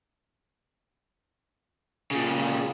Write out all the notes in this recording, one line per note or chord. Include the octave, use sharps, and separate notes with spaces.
A#2 C#3